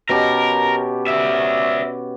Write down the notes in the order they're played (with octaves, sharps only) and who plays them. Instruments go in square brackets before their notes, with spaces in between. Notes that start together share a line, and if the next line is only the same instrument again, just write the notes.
[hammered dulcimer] B2 C#4 G4 [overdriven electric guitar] A#4
[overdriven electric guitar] D5 E5